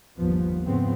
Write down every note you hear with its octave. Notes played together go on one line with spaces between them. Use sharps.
G1 D#2 F3 B3
F2 G#2 C#3 F3 B3 C4